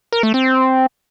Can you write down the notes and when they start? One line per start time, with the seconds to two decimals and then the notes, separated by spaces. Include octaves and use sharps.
0.13 A#4
0.23 A3
0.34 C4